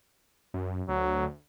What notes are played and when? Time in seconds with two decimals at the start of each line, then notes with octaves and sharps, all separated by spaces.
0.54 F#2
0.89 D2 F#3